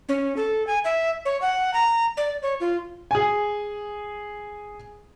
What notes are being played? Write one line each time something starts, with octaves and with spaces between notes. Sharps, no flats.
C#4
A4
G#5
E5
C#5
F#5
A#5
D5
C#5
F4
G#4 G#5